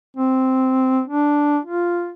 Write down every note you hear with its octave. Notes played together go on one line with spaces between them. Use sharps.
C4
D4
F4